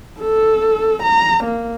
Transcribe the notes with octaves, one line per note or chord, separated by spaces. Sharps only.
A4
A#5
A#3